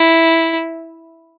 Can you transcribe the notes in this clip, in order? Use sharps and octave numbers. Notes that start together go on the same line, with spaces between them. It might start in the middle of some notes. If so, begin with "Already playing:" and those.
Already playing: E4